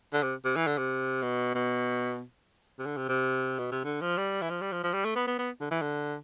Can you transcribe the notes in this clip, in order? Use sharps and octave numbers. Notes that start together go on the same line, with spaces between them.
D3
C3
C3
E3
D3
C3
B2
B2
C3
D3
C3
C3
B2
C3
D3
F3
G3
E3
F3
G3
F3
F3
G3
A3
B3
B3
B3
D3
E3
D3